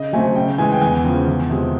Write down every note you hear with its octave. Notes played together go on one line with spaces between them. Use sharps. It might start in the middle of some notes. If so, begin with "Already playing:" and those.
Already playing: C#3 D#5
F#3 A3 C4 G#5
C#3 G5
E3 G#3 G#5
G5
E2 G#5
C#3 F3 G5
E2
C3 F3 G#3